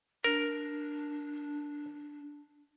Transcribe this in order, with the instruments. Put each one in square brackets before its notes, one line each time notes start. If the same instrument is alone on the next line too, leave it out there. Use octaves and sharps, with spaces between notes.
[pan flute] D4 [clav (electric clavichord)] A#4